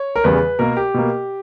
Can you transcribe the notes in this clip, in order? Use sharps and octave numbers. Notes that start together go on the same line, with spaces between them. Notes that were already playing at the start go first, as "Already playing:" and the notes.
Already playing: C#5
A#4
E2 C#3 G3 B4
B2 A#3 A#4
G4
B2 A#3